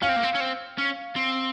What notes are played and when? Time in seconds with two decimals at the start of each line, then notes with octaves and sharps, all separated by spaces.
0.02 C#4 F5 F6
0.09 C4
0.16 A#3
0.23 C4
0.35 C#4
0.40 C4
0.78 C#4
1.16 C4